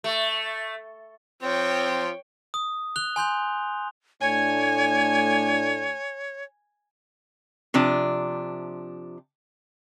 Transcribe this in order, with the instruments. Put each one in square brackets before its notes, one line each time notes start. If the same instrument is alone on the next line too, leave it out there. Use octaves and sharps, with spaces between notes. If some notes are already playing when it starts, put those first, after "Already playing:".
[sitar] A3
[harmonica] F3 C4 [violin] C#5 G5
[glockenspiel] D#6
F#6 F7 G7
G#5 C6 G6 F7
[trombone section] A2 A3 D4 [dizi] C#5 [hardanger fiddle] G#5
[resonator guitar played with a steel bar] C3 F3 D4